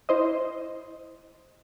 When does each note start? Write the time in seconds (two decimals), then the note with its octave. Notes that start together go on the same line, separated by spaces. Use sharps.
0.09 E4 C5 D#5